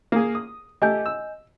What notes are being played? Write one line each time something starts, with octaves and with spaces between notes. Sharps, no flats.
A#3 G#4
D#6
A3 G4 D#5 G#5 G6
E6